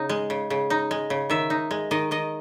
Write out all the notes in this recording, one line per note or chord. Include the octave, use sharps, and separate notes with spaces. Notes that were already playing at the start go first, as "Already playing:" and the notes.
Already playing: C#3 D#4
G#3
C#3
C#3
D#4
G#3
C#3
D#3 E5
D#4
G#3
D#3 D#5
D#3 D#5